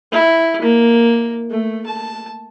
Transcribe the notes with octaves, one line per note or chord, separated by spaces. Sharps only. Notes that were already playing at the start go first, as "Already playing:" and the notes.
E4
A#3
A3
A5